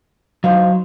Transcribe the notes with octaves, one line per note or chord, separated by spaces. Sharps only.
F#3 D#4 C5 F5